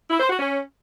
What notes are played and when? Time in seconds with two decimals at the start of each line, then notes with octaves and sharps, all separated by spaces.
0.10 E4
0.20 C5
0.29 F#4
0.39 C#4